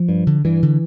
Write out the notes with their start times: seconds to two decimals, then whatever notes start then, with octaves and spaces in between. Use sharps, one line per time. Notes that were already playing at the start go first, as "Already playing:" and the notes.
Already playing: F3
0.09 G2
0.27 D3
0.45 G2 E3
0.62 D3